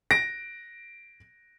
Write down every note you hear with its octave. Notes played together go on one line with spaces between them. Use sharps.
A#6 D7